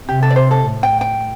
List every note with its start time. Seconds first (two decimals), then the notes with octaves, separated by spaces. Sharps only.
0.08 C3 G4
0.23 A4
0.30 D5
0.36 C5
0.51 A4
0.65 A2
0.83 G5
1.01 G5